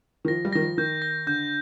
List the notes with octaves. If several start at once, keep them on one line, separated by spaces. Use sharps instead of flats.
D#3
F3 A#6
G3
D#3 A#6
F3
D#3 G6
A#6
D3 G6